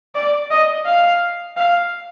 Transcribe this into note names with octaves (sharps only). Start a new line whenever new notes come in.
D5
D#5
F5
F5